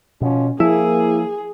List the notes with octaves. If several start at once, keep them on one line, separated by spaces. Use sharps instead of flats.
B2 F3 C#4
F3 A#3 E4 G#4